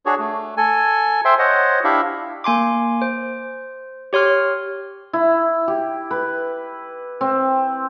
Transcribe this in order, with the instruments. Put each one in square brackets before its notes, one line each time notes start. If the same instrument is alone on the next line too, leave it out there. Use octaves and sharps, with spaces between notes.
[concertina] D4 F#4 G#4 C#5
A3
A4 G#5
C5 E5 G5 C6
C5 C#5 D#5 F#5
D4 E4 G4 E5 F5
[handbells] A#3 G#5 C6 D6
C5
G4 C#5 C6 F6
[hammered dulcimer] E4
G4
B4
C4